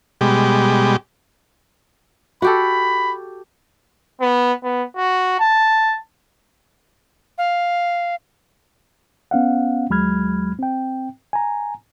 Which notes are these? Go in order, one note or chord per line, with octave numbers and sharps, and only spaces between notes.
B2 G3 G#3 G4
F#4 G4 A4 B5
B3
B3
F#4
A5
F5
B3 C#4 F5 F#5
D#2 F#3 G#3 B5 F6 G#6
C4 G5
G#5 A#5